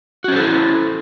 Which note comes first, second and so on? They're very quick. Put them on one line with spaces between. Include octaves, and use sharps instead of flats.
F#4 C#4 C5 A4 E4